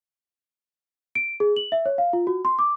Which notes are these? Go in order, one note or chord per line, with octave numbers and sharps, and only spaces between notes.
D7
G#4
F#7
E5
C#5
F5
F4
F#4
C6
D6